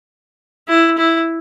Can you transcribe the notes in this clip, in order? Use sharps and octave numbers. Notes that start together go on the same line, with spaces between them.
E4
E4